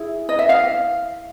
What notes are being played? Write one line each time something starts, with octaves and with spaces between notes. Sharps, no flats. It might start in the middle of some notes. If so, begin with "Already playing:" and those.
Already playing: E4 G#4
D#5
E5
F5